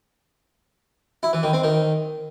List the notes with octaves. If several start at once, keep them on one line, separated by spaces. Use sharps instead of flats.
E4
E3
D#3
C4
D#3